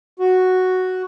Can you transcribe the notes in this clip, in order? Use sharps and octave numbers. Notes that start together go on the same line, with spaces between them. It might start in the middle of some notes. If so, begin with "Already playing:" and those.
F#4